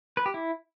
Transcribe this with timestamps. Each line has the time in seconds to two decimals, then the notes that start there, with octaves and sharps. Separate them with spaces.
0.17 B4
0.26 G4
0.34 E4